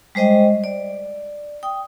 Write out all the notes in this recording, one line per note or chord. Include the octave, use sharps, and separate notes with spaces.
G3 G#3 C5 D#5 G5
D5
G5 D#6